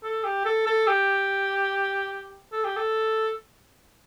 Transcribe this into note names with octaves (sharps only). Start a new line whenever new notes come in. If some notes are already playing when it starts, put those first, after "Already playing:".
A4
G4
A4
A4
G4
A4
G4
A4